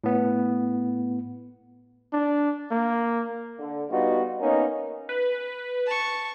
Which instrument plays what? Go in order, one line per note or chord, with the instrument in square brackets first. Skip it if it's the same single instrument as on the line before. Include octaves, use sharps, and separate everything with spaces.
[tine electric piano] A2 B3
[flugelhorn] D4
A#3
[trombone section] D3
G3 B3 D#4 F4 F#4
A#3 B3 C#4 D#4
[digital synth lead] B4
[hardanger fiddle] A5 C#6